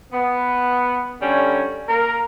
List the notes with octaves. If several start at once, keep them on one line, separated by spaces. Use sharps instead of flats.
B3
D3 G3 C#4
A#3 A#4